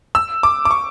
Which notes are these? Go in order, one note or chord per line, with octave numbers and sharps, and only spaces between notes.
E6
D6
D6
C#6